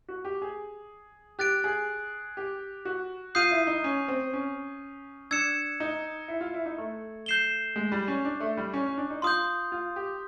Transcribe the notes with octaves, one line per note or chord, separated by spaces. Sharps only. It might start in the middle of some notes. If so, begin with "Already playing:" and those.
F#4
G4
G#4
G4 F#6 A6 D7
G#4
G4
F#4
F4 D#6 G6 C7 D#7
E4
D#4
C#4
C4
C#4
D4 E6 G#6 C#7 E7
D#4
E4
F4
E4
D#4
A3
G6 C7 E7 G7
G#3
G3
C#4
D4
A3
G3
C#4
C#4
D4
D#4
F4 C6 D#6 G6
F4
G4